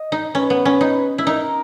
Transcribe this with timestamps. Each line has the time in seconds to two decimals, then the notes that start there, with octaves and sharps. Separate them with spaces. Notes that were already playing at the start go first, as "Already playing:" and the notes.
Already playing: D#5
0.12 D#4
0.34 C#4 B4
0.50 B3
0.65 C#4
0.81 D#4
1.18 E4
1.27 D#4 A#4